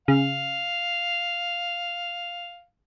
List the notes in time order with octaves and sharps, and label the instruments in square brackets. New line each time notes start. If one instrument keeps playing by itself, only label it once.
[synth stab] C#3 [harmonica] F5